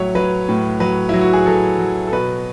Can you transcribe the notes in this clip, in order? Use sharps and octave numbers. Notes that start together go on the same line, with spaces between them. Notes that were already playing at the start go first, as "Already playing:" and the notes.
Already playing: A2 F#3 C#5 E5
F#3 B4
A2
F#3 B4
F#3 E4
F#4
G#4
F#3 A4
F#3
A4
B2 B4